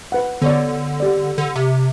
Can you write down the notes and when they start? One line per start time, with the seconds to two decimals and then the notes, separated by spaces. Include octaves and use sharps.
0.12 B4 F#5
0.42 D3 B3 C#5 D5
1.00 G4 D5
1.38 D3
1.56 C3